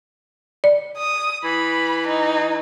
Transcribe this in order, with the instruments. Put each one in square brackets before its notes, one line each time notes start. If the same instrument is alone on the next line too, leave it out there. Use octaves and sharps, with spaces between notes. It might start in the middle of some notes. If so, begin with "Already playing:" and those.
[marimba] D5
[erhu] D#6
[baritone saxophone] E3 [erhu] B5
[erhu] D#4